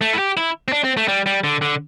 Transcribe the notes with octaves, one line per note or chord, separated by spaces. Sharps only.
A3
E4
G4
E4
C4
D4
C4
A3
G3
G3
D3
D3